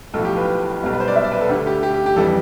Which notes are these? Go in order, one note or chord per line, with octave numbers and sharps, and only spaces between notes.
B1 A2 F3 A4
G4
B4
B1 B2 G3
B4
C5
D5
E5
D5
B4
A4
D2 D3 A3 G4
G4
G4
G4
G4
F2 E3 G3 A4